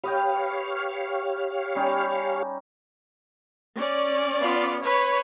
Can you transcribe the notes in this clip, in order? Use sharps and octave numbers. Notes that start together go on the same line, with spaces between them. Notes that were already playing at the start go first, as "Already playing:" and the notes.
G4 B4 C#5 D#5 F5 G5
G3 C#4 D#4
C#4 D5
B3 F4
B4 C#5